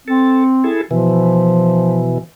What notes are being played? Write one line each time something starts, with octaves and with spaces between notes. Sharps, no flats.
C4 A4
E4 G#4 A4
B2 E3 F3